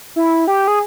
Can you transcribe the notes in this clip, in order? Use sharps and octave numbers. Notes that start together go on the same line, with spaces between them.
E4
G4
G#4